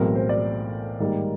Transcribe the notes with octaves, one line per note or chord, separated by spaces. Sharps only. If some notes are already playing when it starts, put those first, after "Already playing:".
Already playing: B1 A2 E3 G#3 C4 A#4
C5
D5
G#2 D#3 G3 A#3